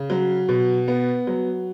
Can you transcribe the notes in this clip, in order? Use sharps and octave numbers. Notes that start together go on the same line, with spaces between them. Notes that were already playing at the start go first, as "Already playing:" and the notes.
Already playing: C#3
F#3
B2
B3
F#3